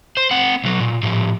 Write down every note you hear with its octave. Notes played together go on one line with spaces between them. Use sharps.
C5
C4 F#5
B1 F#3
A#2
A2 F3